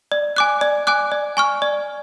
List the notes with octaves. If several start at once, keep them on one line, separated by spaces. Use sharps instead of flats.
D5
G#5 D6 F#6
D5
G#5 D6 F#6
D5
G#5 C#6 F6
D5